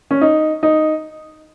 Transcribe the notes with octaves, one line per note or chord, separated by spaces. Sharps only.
C#4
D#4
D#4